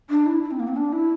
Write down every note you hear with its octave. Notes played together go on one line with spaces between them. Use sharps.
D4
E4
E4
C4
A#3
C4
D4
E4